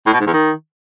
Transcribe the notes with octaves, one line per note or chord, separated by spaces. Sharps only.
A2
B2
G#2
E2
D#3